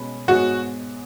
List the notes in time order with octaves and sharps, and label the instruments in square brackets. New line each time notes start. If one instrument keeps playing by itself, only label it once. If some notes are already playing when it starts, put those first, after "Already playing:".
Already playing: [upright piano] B2 G#3 C#4 B4
[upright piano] G#2 G#3 B3 G#4 C#5 [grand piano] F#4